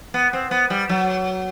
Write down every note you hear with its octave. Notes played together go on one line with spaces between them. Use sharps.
B3
C4
B3
G3
F#3